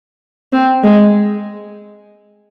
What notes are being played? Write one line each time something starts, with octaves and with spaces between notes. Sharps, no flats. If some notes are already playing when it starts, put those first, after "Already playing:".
C4
G#3